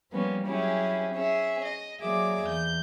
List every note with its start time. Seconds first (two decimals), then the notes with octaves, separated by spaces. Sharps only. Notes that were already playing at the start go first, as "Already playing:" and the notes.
0.11 F3 G3 A#3 B3 C#4
0.45 F#3 C#4 E4 G4 G#4
1.13 C#4 G#4 E5
1.63 D#5
2.01 F#3 A#3 G#4 D5 E5 D6
2.46 E2 G6